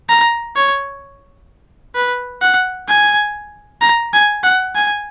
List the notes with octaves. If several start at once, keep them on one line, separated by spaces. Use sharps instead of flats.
A#5
C#5
B4
F#5
G#5
A#5
G#5
F#5
G#5